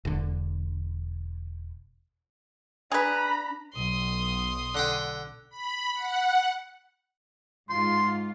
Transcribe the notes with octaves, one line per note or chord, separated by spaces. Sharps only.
E1 D3
D4 G#4 B4 A#5 B5
B1 C6 D#6
D3 F#5 G5
B5
F#5
G#2 F4 C6